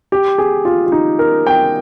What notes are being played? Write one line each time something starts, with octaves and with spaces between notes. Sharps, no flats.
G4
G#4
F4
F4
D#4
A#4
G5